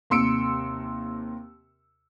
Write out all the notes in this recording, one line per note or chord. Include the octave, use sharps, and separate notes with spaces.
D#2 C3 C6 E6 C#7 D7